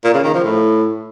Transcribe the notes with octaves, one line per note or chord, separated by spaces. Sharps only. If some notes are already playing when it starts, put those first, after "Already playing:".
A#2
C#3
D#3
F3
A2